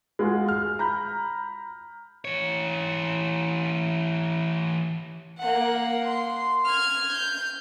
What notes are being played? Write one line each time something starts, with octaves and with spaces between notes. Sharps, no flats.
G#3 F4 F#4 G#4
F6
A#5 B5 G6
E3 C#5
A#3 F#5
C6
F6 G#6
G6